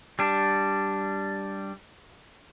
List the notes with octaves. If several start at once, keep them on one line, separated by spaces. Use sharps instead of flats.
G3 D4